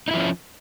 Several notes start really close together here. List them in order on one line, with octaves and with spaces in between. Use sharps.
D#4 E4 F3 C#4